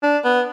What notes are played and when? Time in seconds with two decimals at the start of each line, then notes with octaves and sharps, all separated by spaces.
0.03 D4
0.25 B3